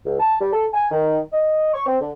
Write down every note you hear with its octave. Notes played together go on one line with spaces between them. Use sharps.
C#2
A5
G3
A4
G#5
D#3
D#5
C#6
C4
D3